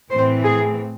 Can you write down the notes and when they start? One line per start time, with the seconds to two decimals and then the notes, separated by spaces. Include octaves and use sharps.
0.10 A2 E3 C4 C5
0.43 G#4